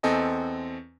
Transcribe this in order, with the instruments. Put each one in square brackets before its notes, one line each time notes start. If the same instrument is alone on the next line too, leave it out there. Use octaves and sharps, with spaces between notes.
[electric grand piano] E2 C4 A4 D#5 G#5